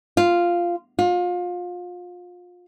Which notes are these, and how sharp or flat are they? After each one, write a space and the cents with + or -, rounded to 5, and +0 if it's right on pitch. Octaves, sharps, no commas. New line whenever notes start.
F4 -5
F4 +30